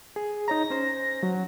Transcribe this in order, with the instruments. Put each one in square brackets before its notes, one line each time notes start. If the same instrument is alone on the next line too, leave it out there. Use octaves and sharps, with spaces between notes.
[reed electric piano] G#4
[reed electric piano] D#4 C#5 A#5 [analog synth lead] A#6
[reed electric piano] C#4 C5
[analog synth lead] F#3